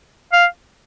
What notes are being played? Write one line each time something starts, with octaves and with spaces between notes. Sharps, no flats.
F5